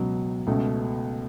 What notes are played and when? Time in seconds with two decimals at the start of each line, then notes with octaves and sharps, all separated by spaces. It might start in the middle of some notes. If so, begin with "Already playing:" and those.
Already playing: C#2 B2 F#3
0.47 C#2 B2 A3